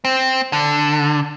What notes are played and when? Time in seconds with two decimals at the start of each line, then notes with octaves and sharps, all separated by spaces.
0.05 C4
0.53 D3